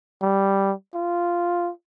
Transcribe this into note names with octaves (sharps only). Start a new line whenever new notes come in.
G3
F4